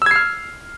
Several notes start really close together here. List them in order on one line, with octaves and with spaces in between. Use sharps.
E6 G#6 C7 F6